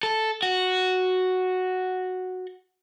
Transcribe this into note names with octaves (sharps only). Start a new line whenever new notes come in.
A4
F#4